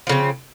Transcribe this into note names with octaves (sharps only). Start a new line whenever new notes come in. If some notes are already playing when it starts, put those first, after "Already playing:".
C#3 F3 C4